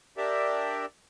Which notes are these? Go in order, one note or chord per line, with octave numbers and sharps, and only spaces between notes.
D4 G4 A#4 D5 E5